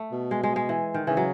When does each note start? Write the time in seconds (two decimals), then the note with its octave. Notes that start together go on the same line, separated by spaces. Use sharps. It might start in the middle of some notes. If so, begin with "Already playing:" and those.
Already playing: A3
0.11 B2
0.31 G#3
0.43 G#3
0.56 G#3
0.69 E3
0.94 D#3
1.07 C#3 E3
1.17 F#3